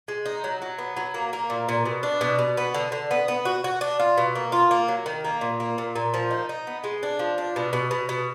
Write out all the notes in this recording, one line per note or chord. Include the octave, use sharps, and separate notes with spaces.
G#3
D#4
F#3
F#3
B3
F#3
A#3
A#3
A#2
A#2
B2
D4
B2
B2
B3
D3
D3
B3
B3
F#4
F#4
D4
F4
B2
A#3
F4
A#3
F#3
D#3
A#3
A#2
A#3
A#2
A#2
F3
D#4
D#4
B3
G#3
D4
F3
D4
B2
B2
B2
B2